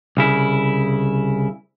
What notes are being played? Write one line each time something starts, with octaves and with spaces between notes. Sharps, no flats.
C2 C#3 E4